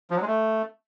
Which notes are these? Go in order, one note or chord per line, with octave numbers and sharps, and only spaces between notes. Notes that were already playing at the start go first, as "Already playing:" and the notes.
F3
F#3
G#3
A3